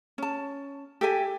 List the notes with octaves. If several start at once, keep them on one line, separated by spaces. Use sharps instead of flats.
C#4 A5
G4 A4 E5 G#5